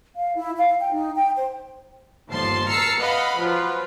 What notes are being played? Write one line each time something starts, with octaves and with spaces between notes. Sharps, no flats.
F5
E4
F5
G5
D#4
G5
C5
G1 D#2 F3 A5 C6 C7
A5 A#5 E6 F6 C7 C#7
B4 D#5 F5 F#5 B5
F3 F#3 F4 B4